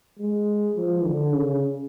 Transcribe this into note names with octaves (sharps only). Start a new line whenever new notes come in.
G#3
F3
D3
C#3